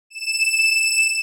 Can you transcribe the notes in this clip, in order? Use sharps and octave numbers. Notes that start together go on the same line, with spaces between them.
E7